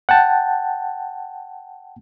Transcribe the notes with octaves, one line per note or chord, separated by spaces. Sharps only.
F#5 G5 A5